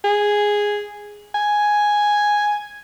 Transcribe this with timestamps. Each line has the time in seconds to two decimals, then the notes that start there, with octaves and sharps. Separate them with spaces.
0.04 G#4
1.35 G#5